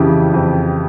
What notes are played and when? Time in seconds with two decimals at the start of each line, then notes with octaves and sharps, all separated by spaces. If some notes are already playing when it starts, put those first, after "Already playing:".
Already playing: F2 C#3 E3 G4
0.34 F2